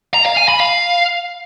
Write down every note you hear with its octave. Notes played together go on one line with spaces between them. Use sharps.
A#5
F5
G#5
B5
F5